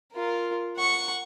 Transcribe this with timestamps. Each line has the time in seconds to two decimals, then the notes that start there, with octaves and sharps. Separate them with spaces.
0.13 F4 A#4
0.77 F#5 C#6